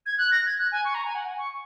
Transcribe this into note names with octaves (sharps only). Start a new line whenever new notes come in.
G#6
F#6
A#6
G#6
F#6
G#5
C#6
A#5
G#5
F#5
G#5
C#6